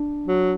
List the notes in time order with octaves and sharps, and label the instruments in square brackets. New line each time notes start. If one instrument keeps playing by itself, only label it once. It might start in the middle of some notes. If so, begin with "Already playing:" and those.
Already playing: [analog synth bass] D4
[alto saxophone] F#3